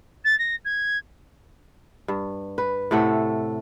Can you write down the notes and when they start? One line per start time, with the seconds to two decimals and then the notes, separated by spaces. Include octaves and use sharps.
0.25 A6
0.39 A#6
0.65 G#6
2.08 G2
2.58 B4
2.91 A2 C3 A3 F#5